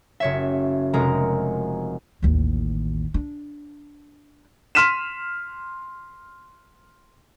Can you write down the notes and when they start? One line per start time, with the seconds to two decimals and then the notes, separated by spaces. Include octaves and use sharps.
0.20 F#1 C#5 E5
0.93 F1 G#3 A#4 A#5
2.22 A1 D#2
3.14 D4
4.75 C6 F6 B6 D#7 E7